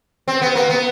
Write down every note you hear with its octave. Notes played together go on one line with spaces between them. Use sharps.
C4
B3
A#3
B3